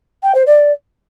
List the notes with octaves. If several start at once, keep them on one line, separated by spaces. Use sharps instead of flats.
G5
C5
D5